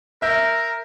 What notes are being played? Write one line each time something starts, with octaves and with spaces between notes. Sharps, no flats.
A#4 E5 G6